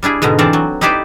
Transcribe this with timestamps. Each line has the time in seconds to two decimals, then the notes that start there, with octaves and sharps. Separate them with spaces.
0.03 G3 D4 E4 G#4
0.22 G#2 B2 D3 A#5
0.39 E3 C4 F4 D5 A5 A#5
0.53 F#3
0.81 D#4 E4 G4 B4 C5 D5